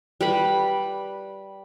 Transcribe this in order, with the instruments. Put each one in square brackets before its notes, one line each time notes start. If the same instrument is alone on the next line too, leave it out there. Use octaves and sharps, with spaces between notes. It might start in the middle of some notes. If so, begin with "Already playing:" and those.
[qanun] G3 B4 B5